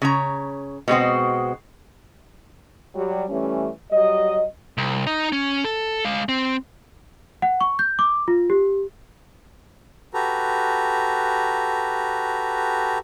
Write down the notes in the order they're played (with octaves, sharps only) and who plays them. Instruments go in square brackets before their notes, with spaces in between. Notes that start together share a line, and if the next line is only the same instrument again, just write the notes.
[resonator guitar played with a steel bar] C#3 C#5 A#5
B2 G#3 C4 F#4
[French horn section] F#3 G3
E3 G3 A3 C#4
F#3 G3 D#5
[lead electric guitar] C2
D#4 D#5
C#4
A4
G#3 F5
C4
[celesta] F#5
C#6
G6
D6
F4
G4
[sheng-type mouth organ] F#4 G4 A4 B4 A#5